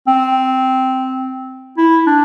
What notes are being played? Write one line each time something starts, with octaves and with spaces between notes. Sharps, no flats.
C4
E4
D4